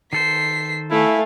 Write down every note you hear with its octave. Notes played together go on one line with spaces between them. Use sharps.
D#3 A4 C5 B6 C7
A3 E4 F5 G#5